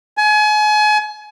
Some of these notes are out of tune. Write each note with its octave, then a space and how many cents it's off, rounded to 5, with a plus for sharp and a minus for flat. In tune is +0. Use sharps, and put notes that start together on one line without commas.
G#5 +35